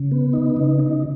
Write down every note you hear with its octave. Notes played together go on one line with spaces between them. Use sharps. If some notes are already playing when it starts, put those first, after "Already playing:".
Already playing: C#3
B3
D#4
C#3
D#4